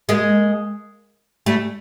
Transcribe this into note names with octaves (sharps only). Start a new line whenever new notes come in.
G#3 A#3
G3 A3